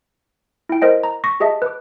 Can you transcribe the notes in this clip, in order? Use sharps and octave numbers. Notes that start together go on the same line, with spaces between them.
E4 G5
A#4 C5 D#5 G5
A#5
C#6 A#6 B6
G4 G#4 D#5 E5 A5
B4 D6